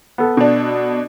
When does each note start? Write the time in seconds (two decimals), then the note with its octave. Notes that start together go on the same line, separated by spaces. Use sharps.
0.18 B3 A4
0.37 B2 D4